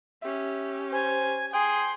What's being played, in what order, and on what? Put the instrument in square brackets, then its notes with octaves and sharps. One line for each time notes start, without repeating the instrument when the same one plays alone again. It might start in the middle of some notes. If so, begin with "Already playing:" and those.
[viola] C#4 G4 [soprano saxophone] E5
[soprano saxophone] C5 [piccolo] G#5
[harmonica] G#4 [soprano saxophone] G5 [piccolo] C6